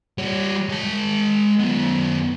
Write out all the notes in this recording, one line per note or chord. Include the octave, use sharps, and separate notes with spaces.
G3 C#5
G#3 A5
F#2 B3